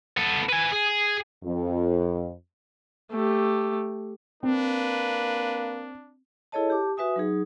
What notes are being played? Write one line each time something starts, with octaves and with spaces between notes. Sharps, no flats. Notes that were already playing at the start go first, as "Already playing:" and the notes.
B3 A4
B4 G#5
G#4
F2
A3 G4
A#3 C4 D4 B4
E4 G#4 A4 C#5 D#5 A5
G4 A5 D6
F#4 B4 E5 G#5 D#6
F#3 D#4 G#4